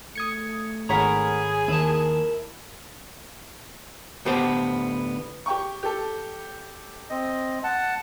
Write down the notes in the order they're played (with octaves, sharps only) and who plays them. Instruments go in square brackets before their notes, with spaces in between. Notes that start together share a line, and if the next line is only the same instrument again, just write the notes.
[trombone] A3 [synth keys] D#6 G#6 C#7
[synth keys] G#1 C#5 B5 [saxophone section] G#4 [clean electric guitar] A#4 F#5 A#5
[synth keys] D#2 [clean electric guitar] E4 A5 [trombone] A#4
[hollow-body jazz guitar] D2 A2 B3 G4 C5 A5
[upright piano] G4 G5 C#6
G4 A4
[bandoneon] C4 D#5
F#5 A5